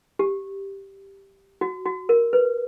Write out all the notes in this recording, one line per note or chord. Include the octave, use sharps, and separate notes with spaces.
G4
F#4
F#4
A#4
B4